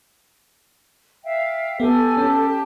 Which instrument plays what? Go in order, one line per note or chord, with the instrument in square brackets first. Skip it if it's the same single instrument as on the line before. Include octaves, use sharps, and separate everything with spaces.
[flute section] E5 F5 G5
[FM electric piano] B3 [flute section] G4 G#5 [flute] A4
[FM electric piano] C#4 [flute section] G4 A5